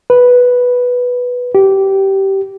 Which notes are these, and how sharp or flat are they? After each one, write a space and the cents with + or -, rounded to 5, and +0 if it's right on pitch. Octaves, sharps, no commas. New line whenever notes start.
B4 -5
G4 -15